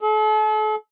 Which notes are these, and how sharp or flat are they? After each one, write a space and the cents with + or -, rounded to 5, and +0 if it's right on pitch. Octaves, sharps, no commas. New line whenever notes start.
A4 -40